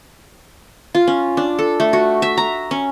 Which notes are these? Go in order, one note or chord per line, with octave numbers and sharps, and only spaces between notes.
F4
C#4
D4
A4
A3
F#4
E5
A#5
C#4